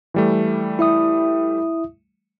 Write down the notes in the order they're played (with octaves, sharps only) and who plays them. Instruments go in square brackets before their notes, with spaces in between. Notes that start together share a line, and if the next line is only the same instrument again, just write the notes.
[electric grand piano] E3 G3 A3
[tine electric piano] E4 E5 D#6